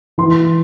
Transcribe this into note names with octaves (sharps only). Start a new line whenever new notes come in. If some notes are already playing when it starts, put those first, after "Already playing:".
E3 C6